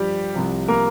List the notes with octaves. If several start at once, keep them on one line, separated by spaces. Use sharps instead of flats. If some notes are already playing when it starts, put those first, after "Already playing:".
Already playing: G2 F3 G3 G4
C2 C3 F3
A#3 A#4